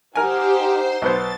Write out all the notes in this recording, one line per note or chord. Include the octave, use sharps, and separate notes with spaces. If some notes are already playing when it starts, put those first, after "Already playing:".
D#4 G4 A#4 C5 F#5 G#5
C5 C6
B1 B3 C5 A6